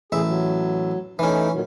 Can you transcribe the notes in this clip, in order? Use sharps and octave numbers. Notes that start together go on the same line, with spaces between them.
A1 G#4 E5
F#3
E3 A3 C#4 D#4 E4
A#2 D#3 F#3